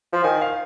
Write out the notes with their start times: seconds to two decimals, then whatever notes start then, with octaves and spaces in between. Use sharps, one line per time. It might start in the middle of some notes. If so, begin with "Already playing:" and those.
0.12 F3
0.24 D#3 G#5
0.41 F5